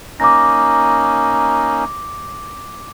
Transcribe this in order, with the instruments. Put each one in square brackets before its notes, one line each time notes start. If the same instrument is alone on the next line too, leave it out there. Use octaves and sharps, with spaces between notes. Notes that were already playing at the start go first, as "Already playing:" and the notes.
[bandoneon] A#3 C#4 D#4 [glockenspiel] D6 A#6